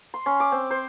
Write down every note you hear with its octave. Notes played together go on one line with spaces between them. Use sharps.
C6
C#4
D6
C4
C5